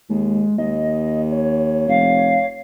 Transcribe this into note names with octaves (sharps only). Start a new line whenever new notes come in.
D#2 G#3
D#2 D#5
C#5
F1 F5